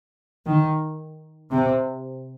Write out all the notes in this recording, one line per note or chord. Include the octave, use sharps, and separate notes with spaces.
D#3
C3